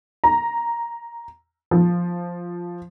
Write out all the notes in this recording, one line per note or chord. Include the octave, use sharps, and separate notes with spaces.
A#5
F3